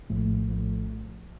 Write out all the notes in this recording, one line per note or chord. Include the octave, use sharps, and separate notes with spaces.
A#1 A2 F3 A3
A#1 A2 F3 A3